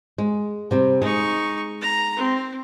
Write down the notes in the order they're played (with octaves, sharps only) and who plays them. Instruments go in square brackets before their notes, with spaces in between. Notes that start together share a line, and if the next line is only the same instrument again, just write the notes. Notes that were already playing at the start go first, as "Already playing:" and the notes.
[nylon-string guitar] G#3
C3 G3 C4
[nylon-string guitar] G#3 G#4 [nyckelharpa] D#4 C#6
[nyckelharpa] A#5
C4